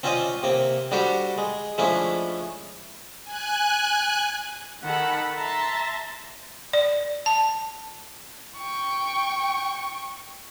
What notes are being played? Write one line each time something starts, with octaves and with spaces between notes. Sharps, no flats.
C4 C#4 F4 C5 D5 D#5
C3 A#3 C4
G3 D4 F#4 G4 A4 C5
G#3
F3 G#3 A3 C#4 D4 E4
G#5 F#6
D#3 A4 F#5 B5
E5 A5 A#5 C6
D5
A5
G5 C#6